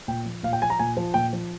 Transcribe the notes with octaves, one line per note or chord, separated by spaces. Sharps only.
A#2 G5
F3
A#2 F5
G5
F3 G#5
A#5
A#2 G#5
F3
A#2 G5
F3